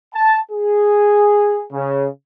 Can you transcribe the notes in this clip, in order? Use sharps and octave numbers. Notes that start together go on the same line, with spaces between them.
A5
G#4
C#3